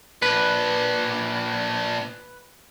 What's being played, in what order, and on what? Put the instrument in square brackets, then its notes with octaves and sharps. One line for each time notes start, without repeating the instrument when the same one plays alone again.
[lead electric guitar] A#2 D4 [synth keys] B4